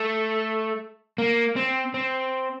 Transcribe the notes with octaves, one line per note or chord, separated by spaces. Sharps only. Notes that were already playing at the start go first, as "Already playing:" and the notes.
Already playing: A3
A#3
C4
C4